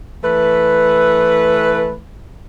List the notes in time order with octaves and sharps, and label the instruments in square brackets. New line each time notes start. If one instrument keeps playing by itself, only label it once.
[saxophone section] E3 A3 B4